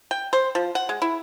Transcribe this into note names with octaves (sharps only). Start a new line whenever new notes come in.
G5
C5
F3
F#5
G#3
E4